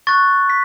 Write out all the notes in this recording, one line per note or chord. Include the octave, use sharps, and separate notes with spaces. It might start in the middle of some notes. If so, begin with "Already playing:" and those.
C#6 F#6 A6
B6